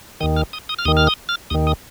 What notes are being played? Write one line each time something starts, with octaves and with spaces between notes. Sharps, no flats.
D#2 D#3 D#6
F6
D#6
D#6
F6
D#2 D#3 D#6
F6
D#6
F6
D#2 D#3 D#6
D#6